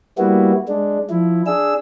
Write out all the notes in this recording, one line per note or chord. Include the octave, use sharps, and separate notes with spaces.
G3 A#3 B3 E4 F#4
G#3 D4
F3 E4
D4 G#4 E6